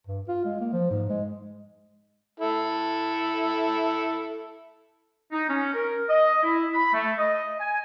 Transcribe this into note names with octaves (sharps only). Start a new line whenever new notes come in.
G2
F4
G#3
A#3
F3
G#2
G#3
E4 A4
D#4
C#4
A#4
D#5
E4
B5
A3
D#5
G#5